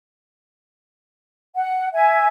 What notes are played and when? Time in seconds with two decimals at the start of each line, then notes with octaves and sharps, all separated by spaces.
1.55 F#5
1.94 E5 G#5